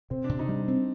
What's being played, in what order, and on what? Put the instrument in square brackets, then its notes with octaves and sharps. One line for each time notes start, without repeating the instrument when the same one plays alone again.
[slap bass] C3 [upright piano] C4
[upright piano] D4
[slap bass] C3
[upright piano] D#4
[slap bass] G3
C4